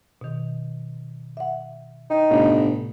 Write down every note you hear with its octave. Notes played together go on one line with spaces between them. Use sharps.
B2 D#3
E5 F#5
D#4 G5
G1 A2 C3 A3